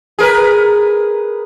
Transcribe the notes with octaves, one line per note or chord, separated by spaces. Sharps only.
G#4 A#4 B4